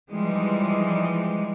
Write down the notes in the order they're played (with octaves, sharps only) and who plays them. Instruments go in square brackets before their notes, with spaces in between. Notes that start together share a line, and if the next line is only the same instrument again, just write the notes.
[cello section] E3 F3 G3 G#3 D#4